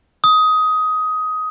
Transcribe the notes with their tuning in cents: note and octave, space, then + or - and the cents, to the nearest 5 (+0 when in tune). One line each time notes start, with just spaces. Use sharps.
D#6 +15